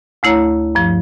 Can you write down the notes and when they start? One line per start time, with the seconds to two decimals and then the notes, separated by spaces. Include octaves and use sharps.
0.23 D2 A3 E4 C#5 A#5
0.75 G2 F3